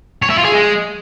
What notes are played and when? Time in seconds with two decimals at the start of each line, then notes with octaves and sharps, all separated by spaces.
0.22 C#5
0.30 E4
0.37 F4
0.45 G#4
0.52 G#3